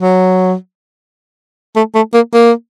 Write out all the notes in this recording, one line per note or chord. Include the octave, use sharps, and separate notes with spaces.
F#3
A3
A3
A#3
A#3